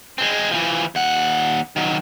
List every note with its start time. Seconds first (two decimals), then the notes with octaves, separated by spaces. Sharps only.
0.18 G#3 C4
0.51 E3 F3
0.95 D#2 F#5
1.76 D#3 F#3